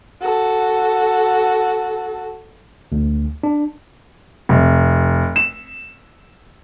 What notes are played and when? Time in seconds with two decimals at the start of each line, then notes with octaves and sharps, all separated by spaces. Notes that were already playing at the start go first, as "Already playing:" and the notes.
0.22 F#4 A4
2.92 D2
3.43 D4
4.49 F1
5.36 E7